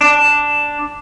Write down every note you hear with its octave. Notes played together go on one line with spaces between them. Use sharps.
D4